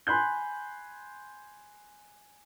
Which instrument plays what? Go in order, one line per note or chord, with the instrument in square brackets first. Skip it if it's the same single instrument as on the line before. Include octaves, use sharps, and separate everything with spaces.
[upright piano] G#5 B5 C6 F#6 G6